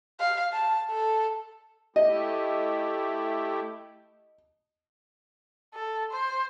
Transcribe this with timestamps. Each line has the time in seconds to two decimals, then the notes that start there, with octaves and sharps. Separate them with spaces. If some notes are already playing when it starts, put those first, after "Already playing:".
0.20 F5
0.53 A5
0.90 A4
1.96 A3 E4 G4 D#5
5.75 A4
6.11 C5